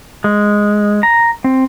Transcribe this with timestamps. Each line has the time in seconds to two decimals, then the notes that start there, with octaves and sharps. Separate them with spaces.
0.24 G#3
1.03 A#5
1.44 C4